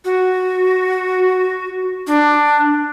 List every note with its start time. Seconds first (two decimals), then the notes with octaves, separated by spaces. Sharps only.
0.05 F#4
2.07 D4